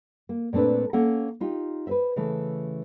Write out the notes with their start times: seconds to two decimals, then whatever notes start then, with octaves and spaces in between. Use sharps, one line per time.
0.29 A#3
0.53 A#2 A3 C4 D4 B4
0.93 A#3 C#4 A4 F#5
1.41 D#4 F4 G4
1.87 B4 C5 E5
2.16 C#3 E3 A3